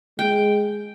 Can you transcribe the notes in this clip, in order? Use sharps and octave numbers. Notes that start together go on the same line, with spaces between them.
G#3 G5